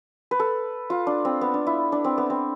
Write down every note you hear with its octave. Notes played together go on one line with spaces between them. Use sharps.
B4
A4
F4
D4
C4
B3
D4
E4
D4
C4
B3
C4